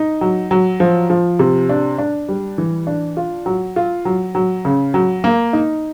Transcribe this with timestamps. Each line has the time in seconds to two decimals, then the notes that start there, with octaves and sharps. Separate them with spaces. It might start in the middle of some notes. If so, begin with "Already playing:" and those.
Already playing: D#4
0.21 F#3
0.51 F#3
0.80 F3
1.10 F3
1.39 C3
1.69 D4
1.98 D4
2.29 G3
2.58 E3
2.87 D4
3.17 F4
3.46 F#3
3.76 F4
4.05 F#3
4.35 F#3
4.65 C#3
4.94 F#3
5.24 A#3
5.53 D#4